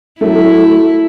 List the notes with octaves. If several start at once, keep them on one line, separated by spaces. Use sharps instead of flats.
F#3 A3 E4